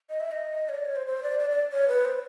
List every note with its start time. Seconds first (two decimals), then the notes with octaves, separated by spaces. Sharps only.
0.10 D#5
0.20 E5
0.31 D#5
0.69 C#5
0.75 D5
0.85 C#5
0.96 C5
1.07 C5
1.23 D5
1.39 D5
1.50 D5
1.72 C#5
1.88 B4
2.05 C5